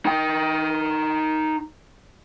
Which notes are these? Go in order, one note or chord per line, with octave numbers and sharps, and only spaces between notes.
D#4 G5